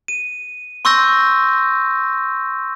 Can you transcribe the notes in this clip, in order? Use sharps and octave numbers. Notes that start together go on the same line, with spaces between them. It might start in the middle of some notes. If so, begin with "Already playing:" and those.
D#7
C6 C#6 E6 G6 A#6